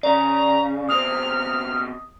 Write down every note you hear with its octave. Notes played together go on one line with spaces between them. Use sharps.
C#3 D5 A#5
B2 C4 D#6 F6